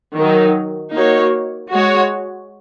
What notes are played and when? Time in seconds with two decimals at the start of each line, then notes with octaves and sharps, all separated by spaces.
0.16 D#3 F#3 D#4
0.93 A#3 D#4 F#4 C#5
1.71 G#3 F#4 C#5